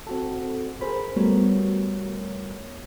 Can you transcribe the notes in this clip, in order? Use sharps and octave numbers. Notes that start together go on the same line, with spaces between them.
C4 F#4 A4
G#4 A#4 C5 B5
G3 A3 B3 F#4 A#4 C#5